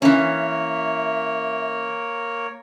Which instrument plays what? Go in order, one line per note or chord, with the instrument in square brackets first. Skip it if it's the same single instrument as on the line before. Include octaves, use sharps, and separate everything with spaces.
[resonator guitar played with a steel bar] E3 C#4 [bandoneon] A#3 A#4 C#5 [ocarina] E5